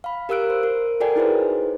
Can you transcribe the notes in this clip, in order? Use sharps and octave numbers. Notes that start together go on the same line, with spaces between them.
F5 B5
G4 A#4 F5 E6 F#6 D7
C5
A#4
F#4 A4 A#4 D5 G5 G#5
D#4 E4 G#4 B4 C5